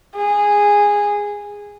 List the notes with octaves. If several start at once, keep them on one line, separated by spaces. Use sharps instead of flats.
G#4